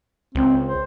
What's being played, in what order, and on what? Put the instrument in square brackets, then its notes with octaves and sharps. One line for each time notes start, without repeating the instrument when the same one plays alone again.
[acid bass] C#2 [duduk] C4
[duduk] C5